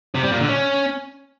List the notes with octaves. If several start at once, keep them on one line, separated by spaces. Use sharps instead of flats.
C3
G3
A#2
D3
C#4